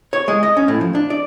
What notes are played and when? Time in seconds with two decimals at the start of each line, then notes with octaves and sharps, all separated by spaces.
0.13 C#5
0.28 G#3
0.43 D#5
0.57 C#4
0.68 A2
0.81 F3
0.95 D4
1.10 D5